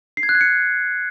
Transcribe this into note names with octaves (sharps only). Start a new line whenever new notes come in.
C7
G#6
F#6
G#6
C#7